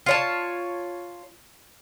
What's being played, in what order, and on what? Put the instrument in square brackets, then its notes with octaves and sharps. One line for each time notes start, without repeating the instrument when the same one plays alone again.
[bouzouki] F4 C#5 A5